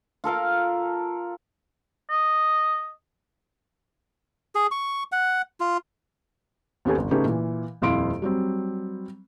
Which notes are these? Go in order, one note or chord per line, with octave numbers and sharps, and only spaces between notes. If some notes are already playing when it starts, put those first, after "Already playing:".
F4 A4 A#4 F5
D#5
G#4
C#6
F#5
F4
D#2 B3 C#4 G4 A4 G#5
G1
C#3 A3 C#4 D#4 G4 B4
A#2 E3
D#1 F2 E4 F5 C6 D7
F#3 G3 C4